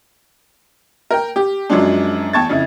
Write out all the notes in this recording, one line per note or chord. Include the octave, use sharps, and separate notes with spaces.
A#4 G5
G4
F#2 F3 F#3 G#3 D4
E2 G5 A5 C#6 G#6 A6
F2 C#3 E4